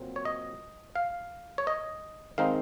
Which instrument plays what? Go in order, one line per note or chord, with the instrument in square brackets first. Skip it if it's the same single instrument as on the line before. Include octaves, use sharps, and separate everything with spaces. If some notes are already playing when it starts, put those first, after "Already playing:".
Already playing: [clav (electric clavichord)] A#2 F#3 C4
C#5
D#5
F5
C#5
D#5
D#3 G#3 C4 D#4 F5